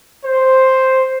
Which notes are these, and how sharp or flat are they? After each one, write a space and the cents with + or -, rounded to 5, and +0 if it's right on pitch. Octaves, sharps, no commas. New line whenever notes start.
C5 +0